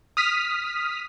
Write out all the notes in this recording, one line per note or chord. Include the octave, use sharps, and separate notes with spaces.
D#6 F6 B6